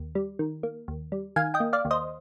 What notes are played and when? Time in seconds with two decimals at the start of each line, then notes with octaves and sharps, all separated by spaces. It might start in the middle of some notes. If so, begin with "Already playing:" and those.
Already playing: D#2
0.15 G3
0.39 D#3
0.63 A#3
0.88 D#2
1.12 G3
1.36 D#3 F5 G#5
1.54 D#5 G5
1.60 A#3
1.73 D5 F5
1.85 D#2
1.91 C5 D#5